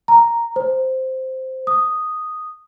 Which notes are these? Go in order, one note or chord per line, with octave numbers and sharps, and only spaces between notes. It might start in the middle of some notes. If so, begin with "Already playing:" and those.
A#5
C5
D#6